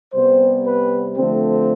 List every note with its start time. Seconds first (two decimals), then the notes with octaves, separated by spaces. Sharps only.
0.13 C3 G3 B3 C5
0.64 B4
1.15 D3 F3 A3 C4